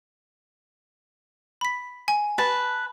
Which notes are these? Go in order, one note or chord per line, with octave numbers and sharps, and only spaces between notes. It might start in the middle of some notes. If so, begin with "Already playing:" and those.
B5 B6
G#5
B4 A5